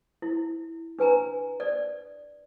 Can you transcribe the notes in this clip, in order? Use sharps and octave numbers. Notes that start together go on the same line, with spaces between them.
E4
D4 B4 G#5 A#5
D5